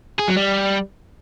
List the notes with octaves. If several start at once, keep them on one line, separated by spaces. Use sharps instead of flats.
G#4
F#3
G3